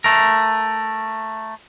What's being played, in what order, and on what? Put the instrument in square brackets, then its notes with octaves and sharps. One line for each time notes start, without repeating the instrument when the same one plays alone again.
[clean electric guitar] A3 A#4